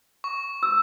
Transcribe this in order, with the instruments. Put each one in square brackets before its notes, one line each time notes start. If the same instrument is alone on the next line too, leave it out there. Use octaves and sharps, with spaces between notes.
[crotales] C#6
[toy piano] E6